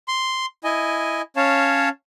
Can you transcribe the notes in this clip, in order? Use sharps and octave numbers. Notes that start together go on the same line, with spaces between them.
C6
E4 D#5 G#5
C#4 C#5 F5 A5